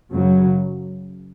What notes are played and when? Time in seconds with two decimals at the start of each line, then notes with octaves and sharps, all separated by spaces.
0.13 F#2 C#3 F#3